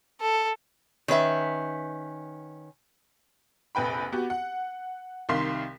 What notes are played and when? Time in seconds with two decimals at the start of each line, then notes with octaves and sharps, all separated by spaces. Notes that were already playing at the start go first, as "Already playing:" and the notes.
0.21 A4
1.08 D#3 C#4 B4 E5
3.75 F1 A#1 B4 G5 B5
4.12 B3 F#4 G4
4.30 F#5
5.29 C2 D#3 F5 C6 B6